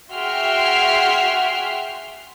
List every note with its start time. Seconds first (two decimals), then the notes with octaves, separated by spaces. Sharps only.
0.12 F#4 G#4 E5 G5 C6 F6